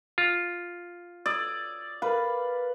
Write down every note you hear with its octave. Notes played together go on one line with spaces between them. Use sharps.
F4
D5 D#6 E6 G#6
A#4 B4 F5